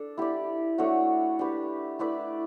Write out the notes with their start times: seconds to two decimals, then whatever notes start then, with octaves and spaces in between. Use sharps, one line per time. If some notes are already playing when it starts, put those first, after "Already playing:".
Already playing: D4 A4
0.18 E4 G4 D5
0.78 A3 D4 F#4 C#5
1.39 D4 G4 B4
1.99 A3 E4 B4 D5